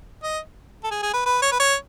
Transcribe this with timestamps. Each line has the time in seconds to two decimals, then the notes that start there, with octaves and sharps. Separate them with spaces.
0.23 D#5
0.84 A4
0.91 G#4
1.02 G#4
1.13 B4
1.26 B4
1.42 C#5
1.52 B4
1.60 C#5